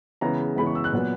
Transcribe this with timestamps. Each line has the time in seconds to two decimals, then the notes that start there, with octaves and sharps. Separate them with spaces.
0.21 C#3 E3 G#3 B3 A#5
0.56 C#3 E3 G#3 B3 B5
0.66 C#6
0.75 E6
0.84 F#6
0.92 A#2 F#3 B3